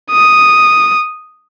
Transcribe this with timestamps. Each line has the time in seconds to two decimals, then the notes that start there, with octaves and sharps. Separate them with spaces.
0.11 D#6